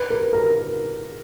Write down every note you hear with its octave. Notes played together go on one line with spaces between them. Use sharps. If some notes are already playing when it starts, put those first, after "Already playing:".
Already playing: B4
A#4
A#4